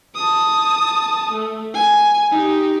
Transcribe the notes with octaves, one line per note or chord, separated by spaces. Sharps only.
A5 D#6
A3
G#5
D#4 G4